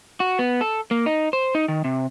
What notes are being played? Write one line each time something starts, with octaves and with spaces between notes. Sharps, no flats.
F#4
B3
A4
A#3
D#4
C5
D#4
D#3
C3